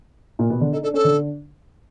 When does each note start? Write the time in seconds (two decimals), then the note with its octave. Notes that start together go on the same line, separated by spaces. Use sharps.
0.39 A#2 A#3
0.50 B2 B3
0.61 D3 D4
0.72 D#4 A4
0.83 D4 A4
0.94 C#4 A4
1.04 D3 D4